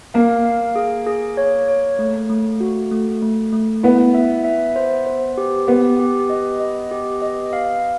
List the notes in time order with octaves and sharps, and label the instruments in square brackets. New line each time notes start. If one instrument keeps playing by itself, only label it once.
[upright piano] A#3 [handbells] F5
[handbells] F5
G#4
G#4
C#5
C#5
A3
A3
F#4
A3
A3
A3
[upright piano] B3 [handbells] E4
[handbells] E5
E5
C5
C5
G4
[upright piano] B3 [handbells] G4
[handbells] G4
D#5
D#5
G4
D#5
F5